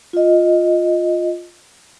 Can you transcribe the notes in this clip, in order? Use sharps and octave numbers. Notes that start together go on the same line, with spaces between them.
F4 D#5